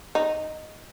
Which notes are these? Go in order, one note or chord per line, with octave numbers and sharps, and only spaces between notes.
D#4